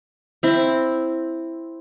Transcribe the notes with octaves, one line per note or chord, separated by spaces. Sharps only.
C4 E4